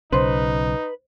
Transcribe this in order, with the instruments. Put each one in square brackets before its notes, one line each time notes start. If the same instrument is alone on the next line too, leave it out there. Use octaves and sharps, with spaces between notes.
[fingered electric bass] B1 C#3 [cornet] D#4 [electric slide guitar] B4 [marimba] C5 C6